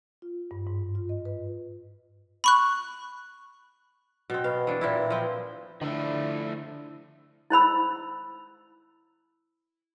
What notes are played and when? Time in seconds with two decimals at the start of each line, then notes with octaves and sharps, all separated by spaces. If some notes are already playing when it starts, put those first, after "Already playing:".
0.22 F4
0.51 G2
0.67 G#2
0.95 F4
1.09 D#5
1.25 B4
2.44 B5 C#6 F#6
4.30 B2 C4
4.44 B2 F5
4.67 E3 D4
4.81 A#2 E3 C4 E4
5.10 F3 C4
5.81 D3 F3 A3 D4 E4
7.50 E4 C5 B5 E6